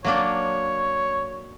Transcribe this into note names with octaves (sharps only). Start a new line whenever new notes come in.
F#3 A#3 D4 C#5